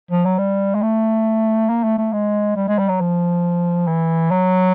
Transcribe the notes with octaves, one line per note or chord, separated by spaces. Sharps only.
F3
F#3
G3
G#3
A3
A#3
A3
A3
G#3
G3
G#3
G3
F#3
F3
E3
F#3